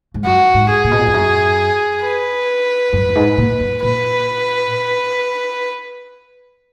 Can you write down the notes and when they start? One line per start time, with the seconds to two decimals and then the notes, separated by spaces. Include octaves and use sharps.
0.14 G#2
0.24 F#2 F#4
0.54 G#2
0.70 G#4
0.84 A#2
0.91 B2
0.99 A#2
1.07 F2
1.14 F#2
2.03 B4
2.93 F#2
3.09 F#2
3.15 G#2
3.38 A#2
3.60 F#2
3.83 A#2 B4